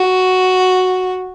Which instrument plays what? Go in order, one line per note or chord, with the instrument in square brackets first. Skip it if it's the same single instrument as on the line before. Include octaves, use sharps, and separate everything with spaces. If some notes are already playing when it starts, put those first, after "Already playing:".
Already playing: [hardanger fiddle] F#4